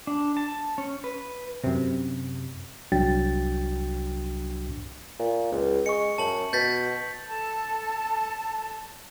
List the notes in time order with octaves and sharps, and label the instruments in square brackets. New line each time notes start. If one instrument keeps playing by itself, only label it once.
[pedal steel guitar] D4
A5
C#4
B4
[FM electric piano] F#2 C3
[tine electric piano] C2 F#3 D4 F#4 G5 A6
[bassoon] A#2
C#2
[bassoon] G#3 [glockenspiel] C#6 C#7
[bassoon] F#2 [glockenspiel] A5 F#7
[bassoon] B2 [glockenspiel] G6 A6 B6
[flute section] A4 A5